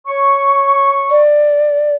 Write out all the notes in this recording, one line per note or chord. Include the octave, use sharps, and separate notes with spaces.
C#5 C#6
D5